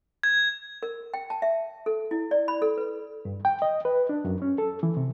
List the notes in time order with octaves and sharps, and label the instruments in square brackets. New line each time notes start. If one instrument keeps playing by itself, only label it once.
[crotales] G#6
[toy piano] A#4
G5
A5
E5
A4
E4
D5
B5
A4
B4
[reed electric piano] G2
G5
D#5
B4
D4
F#2
C#4
A4
E3
C3